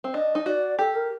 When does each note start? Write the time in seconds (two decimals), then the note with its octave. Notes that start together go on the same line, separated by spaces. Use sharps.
0.04 C4
0.14 D4 D#5
0.35 D#4
0.46 F#4 D5
0.79 G4 A4
0.95 A#4